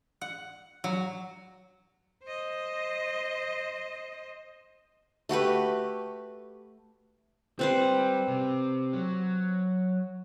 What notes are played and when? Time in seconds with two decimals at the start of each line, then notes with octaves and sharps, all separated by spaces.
0.21 F#5
0.84 F#3
2.23 C5 D#5
5.29 A3 F#4 G4 B4
7.59 G3 C4 B4 C5
8.28 C3
8.93 F#3